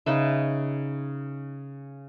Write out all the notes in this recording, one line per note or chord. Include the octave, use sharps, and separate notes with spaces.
C#3 D#4 B4 E5